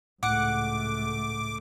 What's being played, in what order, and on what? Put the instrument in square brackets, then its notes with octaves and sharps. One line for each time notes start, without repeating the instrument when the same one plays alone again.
[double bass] C#2 A3 [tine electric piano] A2 [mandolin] F#5 [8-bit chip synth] D6